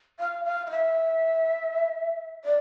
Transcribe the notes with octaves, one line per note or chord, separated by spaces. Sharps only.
F5
F5
F5
E5
D5